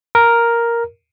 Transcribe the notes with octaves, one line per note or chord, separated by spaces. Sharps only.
A#4